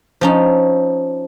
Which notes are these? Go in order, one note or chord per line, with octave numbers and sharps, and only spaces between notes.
F3 C#4 D#4